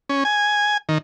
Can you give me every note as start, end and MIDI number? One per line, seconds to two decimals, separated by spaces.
0.09 0.24 61
0.25 0.77 80
0.89 0.98 51